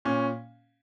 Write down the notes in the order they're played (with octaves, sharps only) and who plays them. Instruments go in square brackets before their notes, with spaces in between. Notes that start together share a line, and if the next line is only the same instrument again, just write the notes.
[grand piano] A#2 C#4